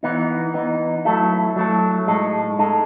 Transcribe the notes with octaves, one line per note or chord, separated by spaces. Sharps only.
E3 B3 D#4
E3 B3 D#4
F#3 A3 E4 A4
F#3 A3 E4 A4
A2 G#3 D#4 A4
A2 G#3 D#4 A4